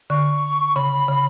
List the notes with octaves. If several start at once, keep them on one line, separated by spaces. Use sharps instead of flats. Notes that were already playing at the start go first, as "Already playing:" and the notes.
D3 C#6
C#3 B5
C#3